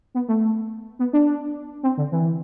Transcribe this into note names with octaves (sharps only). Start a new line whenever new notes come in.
B3
A3
B3
D4
C4
D3
E3